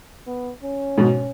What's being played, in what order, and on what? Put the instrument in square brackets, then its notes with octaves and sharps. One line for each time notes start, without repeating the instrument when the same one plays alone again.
[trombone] B3
C#4
[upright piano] G#2 B2